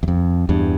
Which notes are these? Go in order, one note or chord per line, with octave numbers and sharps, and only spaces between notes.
E2
F2
E2 G2